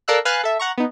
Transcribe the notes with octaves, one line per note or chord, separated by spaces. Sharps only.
A4 A#4 D5 F5 E6 F#6
B4 F5 G#5 F6 F#6 A6
A4 E5
F#5 A#5 C#6
B3 D#4